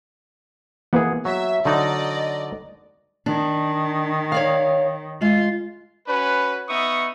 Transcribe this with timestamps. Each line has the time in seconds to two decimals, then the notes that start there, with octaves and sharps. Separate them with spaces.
0.93 E3 A#3 B3 G#4 F#5
1.25 F#3 E5
1.65 D3 F#3 D#4 D5 D#5
3.26 D#3 D4
4.32 C#5 D5 F5
5.21 G#3 F4
6.08 C#4 F#4 B4
6.69 B3 D#4 E5 C#6 D#6